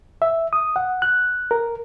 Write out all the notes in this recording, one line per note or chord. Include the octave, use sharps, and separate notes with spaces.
E5
D#6
F#5
F#6
A#4